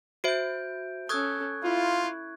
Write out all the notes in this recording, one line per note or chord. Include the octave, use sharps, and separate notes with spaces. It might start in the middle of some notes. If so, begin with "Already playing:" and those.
F#4 C5 E5 G6 D7
C#4 A4 C#6 D#6 E6 F#6 G#6
E4 F4